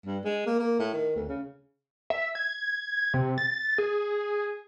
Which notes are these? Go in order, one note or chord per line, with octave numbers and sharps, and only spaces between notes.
G2
G#3
A#3
A#3
A2
D#3
D2
C#3
E5
G#6
C3
A6
G#4